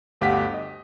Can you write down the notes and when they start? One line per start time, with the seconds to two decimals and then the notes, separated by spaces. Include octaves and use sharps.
0.21 G1 D2 G4 F5 F#5 B6
0.54 D#5